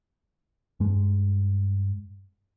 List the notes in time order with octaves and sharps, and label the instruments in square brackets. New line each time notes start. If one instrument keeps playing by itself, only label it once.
[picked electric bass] G2 G#3